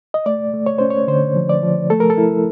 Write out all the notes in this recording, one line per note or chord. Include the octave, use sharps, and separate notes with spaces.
D#5
A3 D5
A3
C#5
C#4 C5
C#5
D3 C5
F3
D5
F3
A3 A4
A#4
A4
E4